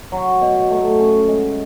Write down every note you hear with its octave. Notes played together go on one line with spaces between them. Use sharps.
F#3
B2
A3
C#4
G#3